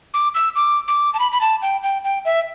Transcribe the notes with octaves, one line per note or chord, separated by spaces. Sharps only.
D6
E6
D6
D6
A5
B5
B5
A5
G5
G5
G5
E5